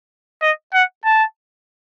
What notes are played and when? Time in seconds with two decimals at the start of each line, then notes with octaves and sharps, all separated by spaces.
0.42 D#5
0.74 F#5
1.05 A5